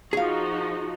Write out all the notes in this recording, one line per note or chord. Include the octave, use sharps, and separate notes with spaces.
F3 D#4 F#4 G#4 F5